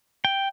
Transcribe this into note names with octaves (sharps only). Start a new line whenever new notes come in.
G5